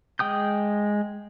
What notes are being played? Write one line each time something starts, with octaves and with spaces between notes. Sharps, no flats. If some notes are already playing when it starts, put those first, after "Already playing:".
G#3 G5 D#6 G6